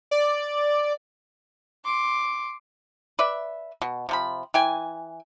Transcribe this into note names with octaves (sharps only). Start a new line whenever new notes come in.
D5
C6 D6
B4 D5 E5
B2
C3 F3 B5
E3 G5 G#5